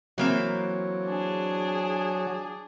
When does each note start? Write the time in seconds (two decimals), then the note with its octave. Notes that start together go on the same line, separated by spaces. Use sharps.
0.18 E3 F#3 A#3 C4
1.06 D4 G#4